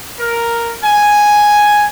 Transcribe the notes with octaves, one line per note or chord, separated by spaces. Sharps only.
A#4
G#5